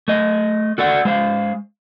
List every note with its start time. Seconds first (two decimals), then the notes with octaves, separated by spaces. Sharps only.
0.08 A3 D#5
0.78 F#4 A4 D5 F#5
1.05 G#3 C5 F5